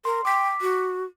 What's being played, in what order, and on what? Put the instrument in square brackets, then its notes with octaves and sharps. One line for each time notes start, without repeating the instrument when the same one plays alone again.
[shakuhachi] A#4 [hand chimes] C6
[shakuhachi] G5 [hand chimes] D6 B6
[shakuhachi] F#4